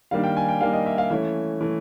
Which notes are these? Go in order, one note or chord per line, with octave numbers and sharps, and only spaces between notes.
D#3 G3 A#3 D4 F5
G5
G#5
G5
D#3 G3 A#3 D4 F5
D#5
E5
F5
E3 A3 C#4 E5
E3 A3